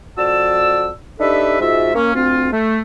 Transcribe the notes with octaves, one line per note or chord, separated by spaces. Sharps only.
F2 F#4 D5 A5 E6
D4 D#4 G4 A4 B4 E5
G#2 G#3 F4 F#4 E5
A#3 C#4
D2 C4 F4
A3